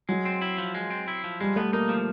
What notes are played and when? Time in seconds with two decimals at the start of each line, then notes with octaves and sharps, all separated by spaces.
0.09 F#3 G#3
0.25 C4
0.42 E4
0.58 F3
0.74 G#3
0.91 C4
1.08 E4
1.24 F3
1.40 G3 G#3
1.56 A3 B3
1.73 A#3 D#4
1.89 F3